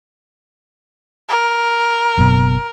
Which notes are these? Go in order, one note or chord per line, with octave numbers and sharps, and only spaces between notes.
A#4
F#1 F#2 B2